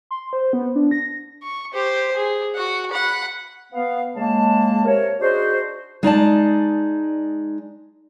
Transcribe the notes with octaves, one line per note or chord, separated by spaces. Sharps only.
C6
C5
B3
D4
A#6
C#6
G4 C5
G#4
F#4 F#5
F#5 B5
B3 F5
C#3 G#3 A#3 A5
C3 A#4 C#5
D4 D#4 F#4 G#4 C5
G#3 D#4 D5 A5